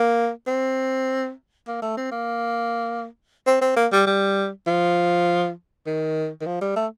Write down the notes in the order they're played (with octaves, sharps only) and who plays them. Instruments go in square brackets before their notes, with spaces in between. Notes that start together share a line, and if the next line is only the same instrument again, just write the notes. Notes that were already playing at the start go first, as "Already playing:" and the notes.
Already playing: [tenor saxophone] A#3
C4
A#3
A3
C4
A#3
C4
C4
A#3
G3
G3
F3
D#3
D#3
F3
G3
A3